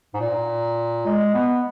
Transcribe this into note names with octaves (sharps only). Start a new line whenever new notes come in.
G#2
A#2
G#3
B3